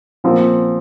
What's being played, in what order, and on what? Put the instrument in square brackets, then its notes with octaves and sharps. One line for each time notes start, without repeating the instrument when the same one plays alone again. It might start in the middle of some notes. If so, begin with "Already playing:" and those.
[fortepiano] A#2 F3 C4